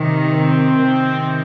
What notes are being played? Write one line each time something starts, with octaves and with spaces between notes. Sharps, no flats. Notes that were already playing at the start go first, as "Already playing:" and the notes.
Already playing: C3 D#3
C4
C3 D#3